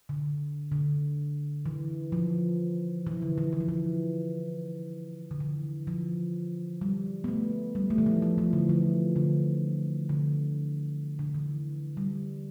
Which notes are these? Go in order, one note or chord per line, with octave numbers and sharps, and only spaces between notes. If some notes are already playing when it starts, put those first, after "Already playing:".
D3
D3
E3
F3
E3
D3
E3
E3
F3
E3
D3
E3
F3
G3
B3
A3
G3
A3
E3
F3
F3
E3
D3
F3
D3
D3
D3
E3
G3